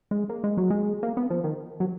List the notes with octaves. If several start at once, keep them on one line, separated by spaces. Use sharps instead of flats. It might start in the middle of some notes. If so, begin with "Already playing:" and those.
G#3
A#3
G#3
F#3
G#3
A#3
B3
F3
D#3
F#3